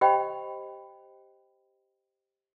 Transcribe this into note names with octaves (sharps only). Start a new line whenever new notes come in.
G4 C5 D#5 G5 B5